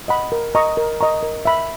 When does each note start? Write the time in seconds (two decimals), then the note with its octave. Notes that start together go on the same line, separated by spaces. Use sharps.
0.08 D#5 F#5 B5
0.32 A#4
0.55 D#5 A#5 C#6
0.77 A#4
1.01 D#5 A#5 C#6
1.23 A#4
1.45 E5 B5